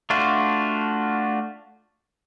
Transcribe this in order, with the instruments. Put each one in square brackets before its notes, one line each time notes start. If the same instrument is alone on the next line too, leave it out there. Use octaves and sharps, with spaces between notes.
[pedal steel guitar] A3 D4 F4 F#4